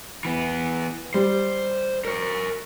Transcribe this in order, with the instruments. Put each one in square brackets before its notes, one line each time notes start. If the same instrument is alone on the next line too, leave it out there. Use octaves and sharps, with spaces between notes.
[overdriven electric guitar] E3 B3
[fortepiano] G3 [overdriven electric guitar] C5
[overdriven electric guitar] A#4 C#5